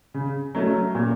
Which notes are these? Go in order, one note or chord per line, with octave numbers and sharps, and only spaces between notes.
C#3
F#3 A3 C#4
A#2